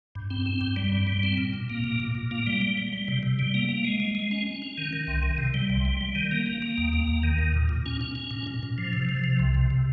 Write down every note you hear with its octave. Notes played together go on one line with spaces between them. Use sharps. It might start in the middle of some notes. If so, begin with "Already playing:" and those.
G2
C4
C4
G2
G3
G2
G3
C4
A#2
A#2
A#3
A#2
A#2
A#2
A#3
G3
G3
G3
G3
C3
C3
G3
A#3
A#3
G#3
G#3
G#3
C#4
C#4
C#4
D#3
D#3
C2
D#3
C3
G3
C2
G3
G3
D#3
A#3
A#3
A#3
D#2
A#3
D#2
D#3
D#2
A#2
A#2
C#4
C#4
C#4
A#2
A#2
A#2
F3
C3
F3
C3
C2
C3
C3